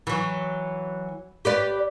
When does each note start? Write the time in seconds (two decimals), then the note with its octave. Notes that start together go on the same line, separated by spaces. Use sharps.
0.07 E3 F#3
1.45 G4 B4 D5